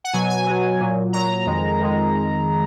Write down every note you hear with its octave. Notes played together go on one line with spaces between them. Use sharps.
F#5
B2 F#3 G#5
G#5
B2 F#3
A#2 F#3
A#2 F#3 A#5
F2 D#3 G#3
F2 D#3 G#3